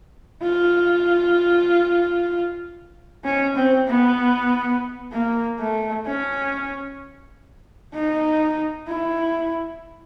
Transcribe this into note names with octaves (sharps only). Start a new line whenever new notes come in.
F4
C#4
C4
B3
A#3
A3
C#4
D#4
E4